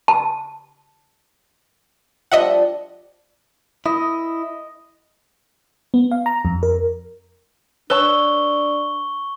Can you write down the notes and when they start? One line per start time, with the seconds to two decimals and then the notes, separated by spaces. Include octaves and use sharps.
0.08 A5
2.32 F3 G3 D4 D#5 E5 F#5
3.86 E4 D#5
5.94 B3
6.11 F5
6.26 A#5
6.45 F2
6.63 A#4
7.90 D4 B4 C#5 A5 C#6 E6 G7